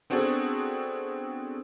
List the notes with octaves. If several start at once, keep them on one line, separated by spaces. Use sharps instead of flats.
B3 C4 D4 F#4 G#4 A4